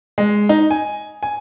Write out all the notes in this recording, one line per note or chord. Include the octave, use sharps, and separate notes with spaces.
G#3
D#4
G#5
G#5